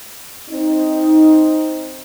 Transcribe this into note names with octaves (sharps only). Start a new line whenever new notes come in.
C4 D#4